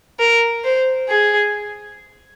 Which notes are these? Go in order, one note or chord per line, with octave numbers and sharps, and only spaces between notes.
A#4
C5
G#4